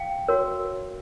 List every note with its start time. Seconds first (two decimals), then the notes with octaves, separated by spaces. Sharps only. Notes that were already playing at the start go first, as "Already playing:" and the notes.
Already playing: F5 G5
0.28 F#4 A#4 C#5